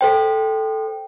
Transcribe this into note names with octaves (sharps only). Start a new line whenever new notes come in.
A4 C5 G5